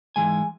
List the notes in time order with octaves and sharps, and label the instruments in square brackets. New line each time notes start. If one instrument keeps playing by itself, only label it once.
[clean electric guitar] G#2 E3 G#3 G#5